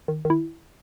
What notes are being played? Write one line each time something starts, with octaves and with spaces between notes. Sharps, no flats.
D#3
D#3
E4